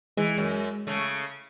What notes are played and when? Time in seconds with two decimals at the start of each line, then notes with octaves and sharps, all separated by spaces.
0.17 E3 G#3
0.38 F#2
0.87 C#3 A3